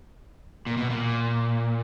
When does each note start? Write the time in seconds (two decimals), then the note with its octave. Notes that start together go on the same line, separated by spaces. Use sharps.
0.67 A#2
0.77 B2
0.90 A#2